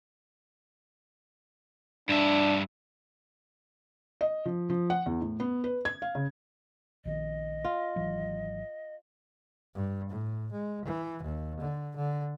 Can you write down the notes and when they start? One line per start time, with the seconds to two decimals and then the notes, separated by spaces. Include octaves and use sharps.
2.09 G2 D4 E5
4.21 D#5
4.45 F3
4.70 F3
4.90 F#5
5.06 E2
5.21 A2
5.40 B3
5.64 B4
5.85 G#6
6.02 F5
6.15 C#3
7.05 A#1 D#3 D#5
7.65 F4
7.96 G#1 E3 F#3
9.75 G2
10.10 A2
10.52 G#3
10.85 E3
11.23 D#2
11.60 D3
11.96 D3